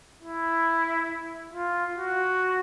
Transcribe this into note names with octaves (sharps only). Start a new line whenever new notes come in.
E4
F4
F#4